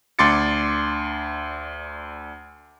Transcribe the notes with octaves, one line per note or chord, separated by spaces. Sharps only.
D2 D4 C6 D6 A6 C#7